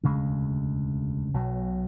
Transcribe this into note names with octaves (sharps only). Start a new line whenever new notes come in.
E1 D2 C#3 G#3
B1 B2 F#3